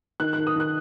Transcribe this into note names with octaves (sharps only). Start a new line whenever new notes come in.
D#3 F#6
F#6
D#3
D#6
D#3 F#6